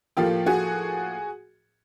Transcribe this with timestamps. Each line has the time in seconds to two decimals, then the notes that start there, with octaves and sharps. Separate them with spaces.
0.17 A2 F3 A#3 F4 G4
0.46 F#4 G#4